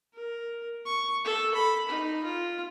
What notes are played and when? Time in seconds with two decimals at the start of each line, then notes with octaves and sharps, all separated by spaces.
0.13 A#4
0.86 C#6
1.25 A4
1.55 B5
1.89 D#4
2.24 F4